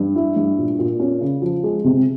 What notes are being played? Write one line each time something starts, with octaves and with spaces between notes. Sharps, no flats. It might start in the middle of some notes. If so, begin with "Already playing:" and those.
Already playing: G2
E4
G2
A#2
A#2
C#4
C#3
F3
G#3
C3